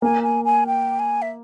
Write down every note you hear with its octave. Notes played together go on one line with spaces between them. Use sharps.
A#3 G#5
G#5
G#5
G5
G#5
E5